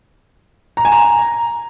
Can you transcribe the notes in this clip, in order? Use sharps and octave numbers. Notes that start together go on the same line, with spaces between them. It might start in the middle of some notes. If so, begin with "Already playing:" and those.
A#5
G#5
A#5